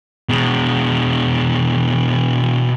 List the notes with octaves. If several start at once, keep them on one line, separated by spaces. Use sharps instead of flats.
B2 G#3